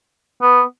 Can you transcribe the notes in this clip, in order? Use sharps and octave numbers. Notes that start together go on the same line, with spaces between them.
B3